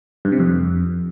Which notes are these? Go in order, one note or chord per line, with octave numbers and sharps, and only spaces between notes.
G2
C3
F2